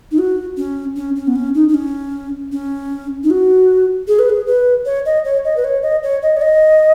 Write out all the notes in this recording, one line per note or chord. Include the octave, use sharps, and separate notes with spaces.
D#4
F#4
C#4
C#4
C#4
B3
C#4
D#4
D#4
C#4
C#4
D#4
F#4
G#4
B4
G#4
B4
C#5
D#5
C#5
D#5
B4
C#5
D#5
C#5
D#5
C#5
D#5